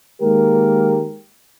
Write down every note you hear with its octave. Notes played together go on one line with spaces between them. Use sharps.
D#3 G#3 A#3 G4 A#4